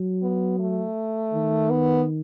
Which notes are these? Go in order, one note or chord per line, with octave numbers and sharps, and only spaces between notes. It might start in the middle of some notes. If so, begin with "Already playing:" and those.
Already playing: F#3
B3
A3
D#3
B3